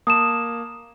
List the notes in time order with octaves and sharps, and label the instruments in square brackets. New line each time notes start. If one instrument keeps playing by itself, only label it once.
[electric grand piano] A#3 A5 [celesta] D#6 E7